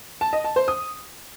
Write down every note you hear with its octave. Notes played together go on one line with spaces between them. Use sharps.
A5
D#5
A5
C5
D#6